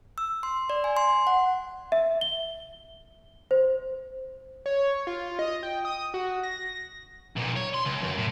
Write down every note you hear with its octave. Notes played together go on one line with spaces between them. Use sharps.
E6
C6
D5
G#5
C6
F#5
E5
G7
C5
C#5
F4
D#5
G5
D#6
F#4
A#6
B1 A#2
C#5
C6
C#2
F#2
A2